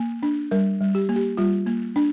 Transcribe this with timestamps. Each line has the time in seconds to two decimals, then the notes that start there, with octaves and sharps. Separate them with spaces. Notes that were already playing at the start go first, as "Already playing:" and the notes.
Already playing: A#3
0.23 D4
0.51 G3 A#4
0.81 G3
0.95 G4
1.09 A#3
1.16 G4
1.37 G3 F4
1.67 A#3
1.96 D4